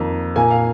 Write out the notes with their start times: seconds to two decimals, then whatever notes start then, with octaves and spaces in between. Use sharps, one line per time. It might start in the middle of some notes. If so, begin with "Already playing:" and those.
Already playing: F2 D#3 A#3
0.36 A#2 A#3 G#5
0.51 F5